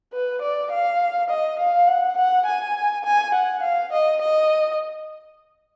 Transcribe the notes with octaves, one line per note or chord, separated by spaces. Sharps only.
B4
D5
F5
D#5
F5
F#5
F#5
G#5
G#5
F#5
F5
D#5
D#5